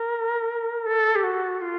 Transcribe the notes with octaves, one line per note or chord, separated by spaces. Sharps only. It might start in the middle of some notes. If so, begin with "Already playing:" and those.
Already playing: A#4
A4
G4
F#4
F4